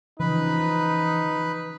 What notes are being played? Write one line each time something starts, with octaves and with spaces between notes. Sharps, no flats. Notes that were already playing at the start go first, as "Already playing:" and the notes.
C#3 E3 F3 D#4 B4